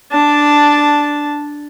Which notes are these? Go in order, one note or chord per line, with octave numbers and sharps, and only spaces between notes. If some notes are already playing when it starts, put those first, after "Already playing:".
D4 A5